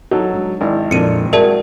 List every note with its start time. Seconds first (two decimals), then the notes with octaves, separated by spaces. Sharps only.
0.11 F#3 D#4 A4
0.34 G#3 D4
0.61 G#1 E4 D5 D#5
0.91 F2 A#2 D4 C#7 D#7
1.33 G#3 F#4 G#4 A#4 D5 E5 A5